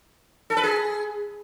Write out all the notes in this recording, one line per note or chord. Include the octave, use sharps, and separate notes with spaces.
A4
B4
G#4